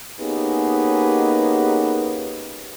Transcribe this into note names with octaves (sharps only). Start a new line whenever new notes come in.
A#3 B3 C#4 D#4 G4 G#4